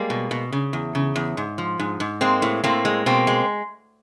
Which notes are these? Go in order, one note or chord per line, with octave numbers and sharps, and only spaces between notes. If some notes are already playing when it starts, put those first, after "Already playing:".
Already playing: G3 G#3 A#3
B2
B2
C#3
E2
C#3
E2
G#2
F3
G#2
G#2
G#3 A#3 C4
A2
A2 A#3 C4
G#3
B2 A#3 C4
G#3